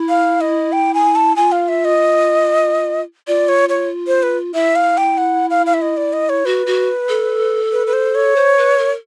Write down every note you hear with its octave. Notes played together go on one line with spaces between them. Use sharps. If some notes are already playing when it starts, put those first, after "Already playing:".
Already playing: E4
F5
D#5
G5
G#5
A5
F4 G#5
F5
E5
D#5
F4 D5
C#5
C#5
C5
B4
E4 E5
F5
G5
F#5
F5
F5
E5
D#5
D5
D#5
C#5
F#4 B4
F#4
A4
B4
B4
C5
C#5
C5
B4
A#4